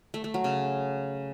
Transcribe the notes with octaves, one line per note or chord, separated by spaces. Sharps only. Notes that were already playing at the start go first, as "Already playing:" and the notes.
A3
A3
F#3
C#3